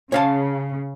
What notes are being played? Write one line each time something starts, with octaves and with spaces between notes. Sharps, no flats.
C#3 C#5 F5 A5